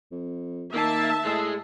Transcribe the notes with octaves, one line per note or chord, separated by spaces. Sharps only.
F2
D#3 A#3 E5 A5
A2 G#3 G#4